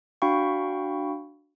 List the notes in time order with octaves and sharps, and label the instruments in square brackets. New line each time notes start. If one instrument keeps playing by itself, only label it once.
[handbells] D4 F#4 F5 G5 B5 C#6